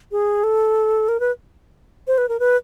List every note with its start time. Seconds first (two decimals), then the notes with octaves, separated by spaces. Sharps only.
0.12 G#4
0.44 A4
1.08 A#4
1.20 B4
2.07 C5
2.18 B4
2.29 A#4
2.40 B4